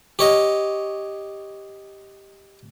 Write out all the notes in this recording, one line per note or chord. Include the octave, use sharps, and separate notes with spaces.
G4 C#5 D#5